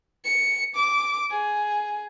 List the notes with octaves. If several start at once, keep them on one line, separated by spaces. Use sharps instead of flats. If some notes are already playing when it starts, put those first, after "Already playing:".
C#7
D6
G#4